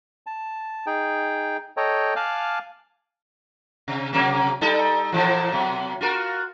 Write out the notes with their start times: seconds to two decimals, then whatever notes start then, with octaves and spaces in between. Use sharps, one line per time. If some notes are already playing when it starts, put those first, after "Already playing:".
0.27 A5
0.86 D#4 G#4 G5
1.77 A4 C#5 D#5 G5 A#5
2.16 F5 G#5 A5 D6 F6 F#6
3.88 C3
4.13 C3 F#3 A#3
4.61 G3 D#4 A4
5.12 A#2 E3 F3
5.52 B2 F#3
6.01 F4 F#4 A#4